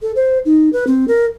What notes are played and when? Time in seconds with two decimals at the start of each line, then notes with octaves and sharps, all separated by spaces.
0.02 A4
0.16 C5
0.45 D#4
0.73 B4
0.87 C4
1.08 A#4